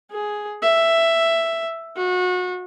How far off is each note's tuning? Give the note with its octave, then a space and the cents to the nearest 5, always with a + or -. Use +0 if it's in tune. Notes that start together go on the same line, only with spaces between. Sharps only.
G#4 +5
E5 +5
F#4 -30